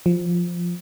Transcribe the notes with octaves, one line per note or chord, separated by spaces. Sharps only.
F3